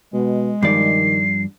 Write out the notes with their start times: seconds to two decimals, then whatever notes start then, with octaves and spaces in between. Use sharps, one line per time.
0.14 B2 G#3
0.63 G2 D#3 F3 D5 C7